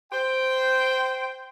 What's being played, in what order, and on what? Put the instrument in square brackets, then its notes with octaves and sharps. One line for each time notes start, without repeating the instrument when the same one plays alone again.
[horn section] C5 G5